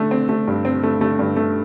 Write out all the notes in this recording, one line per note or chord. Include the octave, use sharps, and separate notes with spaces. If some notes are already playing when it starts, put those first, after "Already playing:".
Already playing: D3 A3
C4
A3
G2
C4
A3
A3
G2
A3